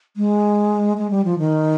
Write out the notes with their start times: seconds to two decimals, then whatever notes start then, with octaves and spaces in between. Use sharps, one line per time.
0.17 G#3
0.97 G#3
1.10 G3
1.25 F3
1.39 D#3